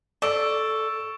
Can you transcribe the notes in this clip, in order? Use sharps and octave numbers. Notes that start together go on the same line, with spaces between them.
A4 D5 C#6 E6 D7